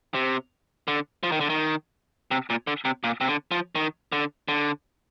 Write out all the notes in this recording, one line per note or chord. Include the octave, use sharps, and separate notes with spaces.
C3
D3
F3
D#3
D3
D#3
C3
A#2
D3
C3
A#2
C3
D3
F3
D#3
D3
D3